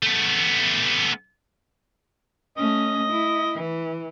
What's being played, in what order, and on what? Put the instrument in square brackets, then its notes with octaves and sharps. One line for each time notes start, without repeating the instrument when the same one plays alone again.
[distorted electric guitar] A3 B3
[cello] A3 C#4 [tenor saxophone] D#5
[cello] E4
E3